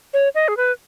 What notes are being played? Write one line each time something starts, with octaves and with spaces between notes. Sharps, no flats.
C#5
D#5
G#4
B4